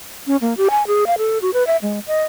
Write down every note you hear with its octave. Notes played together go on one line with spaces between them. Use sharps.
C#4
A#3
G4
G#5
G#4
F5
A4
F#4
B4
E5
G#3
D#5